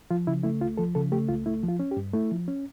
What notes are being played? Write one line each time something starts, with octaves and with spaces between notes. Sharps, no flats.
F3 F4
C#3 E4
A3 E4
C#2 F4
F3 A4
C#3 A4
A3 G4
C#2 F4
A3 E4
F3
F4
C#4
G4
G2
A3 E4
F3
C#4